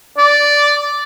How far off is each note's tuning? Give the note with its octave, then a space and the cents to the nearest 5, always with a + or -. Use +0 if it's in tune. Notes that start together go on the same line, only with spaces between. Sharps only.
D5 -5